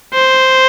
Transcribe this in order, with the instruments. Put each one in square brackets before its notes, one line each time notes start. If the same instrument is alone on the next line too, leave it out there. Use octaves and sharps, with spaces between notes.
[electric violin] C5